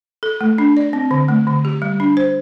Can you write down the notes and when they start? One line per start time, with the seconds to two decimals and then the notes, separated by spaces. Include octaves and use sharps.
0.23 A4
0.41 A3
0.58 D4
0.77 D5
0.93 C4
1.11 D3
1.28 A3
1.47 D3
1.65 G4
1.82 G3
2.00 D4
2.17 C5